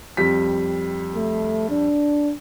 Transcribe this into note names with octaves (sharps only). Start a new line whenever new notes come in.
F2 G3 B6
A3
D4